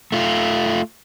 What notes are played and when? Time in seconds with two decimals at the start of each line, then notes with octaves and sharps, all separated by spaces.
0.12 A3 F4